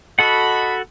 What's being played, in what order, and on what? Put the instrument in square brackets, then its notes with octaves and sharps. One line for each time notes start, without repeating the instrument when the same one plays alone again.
[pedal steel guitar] F#4 A4 F#5 [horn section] D#5 B5